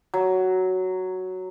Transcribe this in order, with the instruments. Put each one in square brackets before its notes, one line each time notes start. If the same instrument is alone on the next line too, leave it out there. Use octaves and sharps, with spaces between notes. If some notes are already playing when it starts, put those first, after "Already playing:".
[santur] F#3